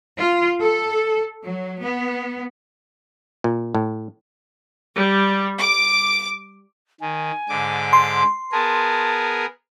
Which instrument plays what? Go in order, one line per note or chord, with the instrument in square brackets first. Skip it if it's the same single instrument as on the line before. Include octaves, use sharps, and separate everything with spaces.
[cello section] F4
A4
F#3
B3
[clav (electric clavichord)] A#2
A2
[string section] G3
D6
[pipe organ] D#3 [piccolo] G#5
[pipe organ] G#2 D3 D6
[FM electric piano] C6
[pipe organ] B3 G#4 A#4 [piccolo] A5